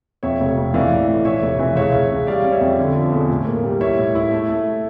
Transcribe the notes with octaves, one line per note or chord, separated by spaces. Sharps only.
F2 C#5 E5
F1
F2
E3 D5 F5
A1
A2
E3 C#5 E5
F1
E3
C#2 C#5 E5
C#2
C#3
G3 D5 F5
C#4
C#5 E5
F2
D3
F3
E2
A2
A#3
G3
E4 C#5 E5
A2
E4
A3
A3